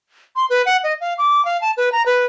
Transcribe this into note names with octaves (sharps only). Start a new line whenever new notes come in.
C6
B4
F#5
D#5
F5
D6
F5
A5
B4
A#5
B4